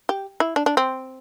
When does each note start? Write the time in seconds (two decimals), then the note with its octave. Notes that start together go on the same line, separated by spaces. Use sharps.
0.09 G4
0.40 E4
0.56 D4
0.66 D4
0.77 C4